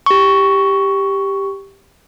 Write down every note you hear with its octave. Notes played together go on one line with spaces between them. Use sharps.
G4 C#6